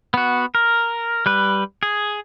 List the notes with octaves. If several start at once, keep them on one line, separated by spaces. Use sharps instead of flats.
B3 F#4
A#4
G3 B4
G#4